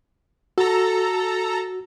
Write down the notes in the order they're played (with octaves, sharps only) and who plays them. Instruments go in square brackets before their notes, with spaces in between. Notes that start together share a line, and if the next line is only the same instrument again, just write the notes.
[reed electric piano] F#4 [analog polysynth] A4 A#5